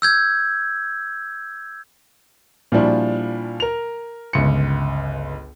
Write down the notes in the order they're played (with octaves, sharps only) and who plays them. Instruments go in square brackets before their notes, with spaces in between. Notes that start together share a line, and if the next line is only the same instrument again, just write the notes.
[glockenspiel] E6 G6 G#6
[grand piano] A#2 F3 G3 D4 E4 F#4
A#4 F7
G1 C#2 C#7